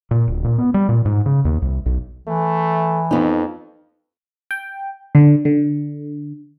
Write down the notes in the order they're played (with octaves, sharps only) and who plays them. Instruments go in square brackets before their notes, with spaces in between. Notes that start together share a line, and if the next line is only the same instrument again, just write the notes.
[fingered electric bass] A#2
D1
A#2
B3
G3
A#2
G#2
C#3
D#2
C2
B1
[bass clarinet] E3 [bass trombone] A3
[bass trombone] F2 [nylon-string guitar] B3 D#4
[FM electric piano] G5
D3
D3